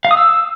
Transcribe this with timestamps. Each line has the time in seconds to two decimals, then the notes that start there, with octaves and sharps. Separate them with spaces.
0.05 F5
0.11 D#6
0.17 E6